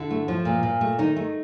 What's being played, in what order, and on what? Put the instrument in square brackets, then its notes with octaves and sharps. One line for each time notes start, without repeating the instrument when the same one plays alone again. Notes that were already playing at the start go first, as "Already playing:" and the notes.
Already playing: [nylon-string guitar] D3 E4
A3
F3
A#2
A#2
A3
D#3 D#4
A3